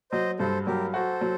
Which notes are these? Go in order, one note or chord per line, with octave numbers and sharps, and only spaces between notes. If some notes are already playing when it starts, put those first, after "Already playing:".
F#3 C5 D#5
G2 A4 C5
F#3 G4 A#4
F#4 A4 C5
F#3